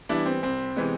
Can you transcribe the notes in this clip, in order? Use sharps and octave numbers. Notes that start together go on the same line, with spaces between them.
E3 G3 B3 D4 E4
C4
C2 C4
C3 E3 G#3 B3